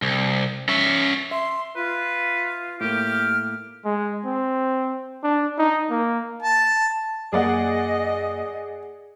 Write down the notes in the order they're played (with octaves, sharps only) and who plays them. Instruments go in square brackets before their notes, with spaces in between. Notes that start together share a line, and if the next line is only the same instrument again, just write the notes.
[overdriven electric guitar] C2
C#4 E5
[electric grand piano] E5 [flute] C6
[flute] F4 [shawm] B4
[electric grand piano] A2 A#3 [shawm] G4 [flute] F6
[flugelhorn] G#3
C4
D4
D#4
A#3
[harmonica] A5
[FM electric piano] F#2 A#3 [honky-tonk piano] G#4 D5 F#5 [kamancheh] D#5